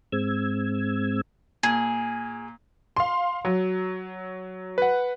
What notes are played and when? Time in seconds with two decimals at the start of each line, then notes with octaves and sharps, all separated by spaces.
0.12 G#2 G#3 C4 E6 G#6
1.63 A#2 G#4
2.96 F5 C6
3.45 F#3
4.78 B4 F#5